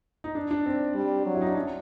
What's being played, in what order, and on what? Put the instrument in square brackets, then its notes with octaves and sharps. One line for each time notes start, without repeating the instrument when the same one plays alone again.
[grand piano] D#4
D4
D4
C4
[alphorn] G3
F#3
[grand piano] E4
D#4
D4
C#4